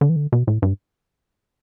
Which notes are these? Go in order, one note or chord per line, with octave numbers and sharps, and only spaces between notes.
D3
E3
D3
B2
A2
G2